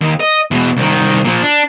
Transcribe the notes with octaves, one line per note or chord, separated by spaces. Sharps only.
D#2
D#5
E2 B2
C2 D#3
A#2 F3
D4